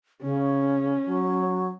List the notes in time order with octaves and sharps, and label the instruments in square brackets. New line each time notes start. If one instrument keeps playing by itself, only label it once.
[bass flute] C#3 [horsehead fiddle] C#4
[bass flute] F#3